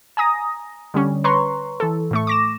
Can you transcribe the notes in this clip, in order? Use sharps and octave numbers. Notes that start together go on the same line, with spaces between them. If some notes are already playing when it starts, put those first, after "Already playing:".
G#5 A#5 D#6 A#6
D3 G3 C#4
B4 C#5 A#5 C6 C#6
E3 A4
A2 A3 C#6
D6 A#6 E7